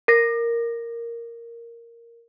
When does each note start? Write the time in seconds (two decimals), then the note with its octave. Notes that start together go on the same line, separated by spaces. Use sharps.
0.08 A#4 A#6